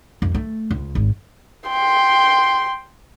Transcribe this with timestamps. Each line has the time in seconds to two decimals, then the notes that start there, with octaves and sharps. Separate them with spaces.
0.22 F2
0.35 A3
0.71 C#2
0.95 G#1
1.69 G5 C6